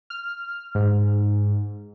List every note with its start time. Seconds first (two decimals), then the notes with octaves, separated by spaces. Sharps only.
0.10 F6
0.75 G#2